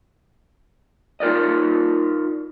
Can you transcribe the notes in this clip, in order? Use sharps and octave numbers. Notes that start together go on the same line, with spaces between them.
D#4 F4 A#4 D5 D#5